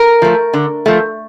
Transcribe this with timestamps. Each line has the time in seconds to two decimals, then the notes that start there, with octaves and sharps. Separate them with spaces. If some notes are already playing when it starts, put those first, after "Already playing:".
Already playing: A#4
0.22 F3 A3
0.54 D3
0.86 F3 A3